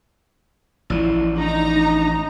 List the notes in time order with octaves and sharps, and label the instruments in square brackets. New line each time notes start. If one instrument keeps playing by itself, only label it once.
[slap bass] A1 F3 [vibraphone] E4 D5
[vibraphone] D4 [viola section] D#4 A#5